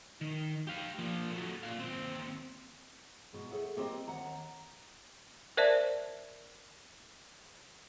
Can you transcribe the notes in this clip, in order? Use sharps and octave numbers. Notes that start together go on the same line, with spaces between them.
D#3
G4 F5
F3 A#3
F#3 A3
A#2 F5
D#2 C4
G#2 B2
G#4 A4 B4 C#5 E5 F#5
G3 A#3 C4 G4 C5 D#5
D#2 G#2 F#5 A#5
A#4 C5 D5 E5 A5